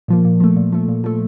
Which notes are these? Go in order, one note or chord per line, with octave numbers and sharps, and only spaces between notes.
A#2 F3 A#3
A#2
F3 A3
A#2
F3 A3
A#2
F3 A3